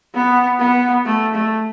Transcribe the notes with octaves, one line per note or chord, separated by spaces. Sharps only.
B3
B3
A3
A3